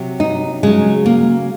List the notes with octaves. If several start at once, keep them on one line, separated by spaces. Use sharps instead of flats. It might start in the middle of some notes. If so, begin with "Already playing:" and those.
Already playing: C3 F#3
D#4
C#3 F#3 G#3
A#3